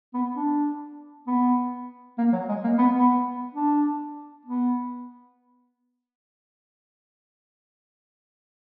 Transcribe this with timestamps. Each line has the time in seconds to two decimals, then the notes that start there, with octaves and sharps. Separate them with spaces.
0.14 B3
0.37 D4
1.27 B3
2.19 A#3
2.33 F#3
2.49 G#3
2.64 A#3
2.79 B3
2.94 B3
3.55 D4
4.45 B3